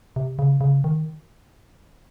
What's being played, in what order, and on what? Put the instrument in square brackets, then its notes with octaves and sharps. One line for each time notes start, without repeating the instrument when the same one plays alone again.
[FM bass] C3
C#3
C#3
D#3